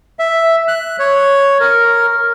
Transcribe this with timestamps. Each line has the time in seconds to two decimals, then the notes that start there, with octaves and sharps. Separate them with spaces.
0.19 E5
0.68 F#6
0.99 C#5
1.60 A#4